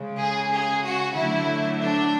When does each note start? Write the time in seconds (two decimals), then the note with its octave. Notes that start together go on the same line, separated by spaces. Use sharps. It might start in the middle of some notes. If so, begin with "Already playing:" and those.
Already playing: C#3 G#3
0.20 G#4
0.53 G#4
0.85 F#4
1.16 D3 F#3 A3 E4
1.81 D4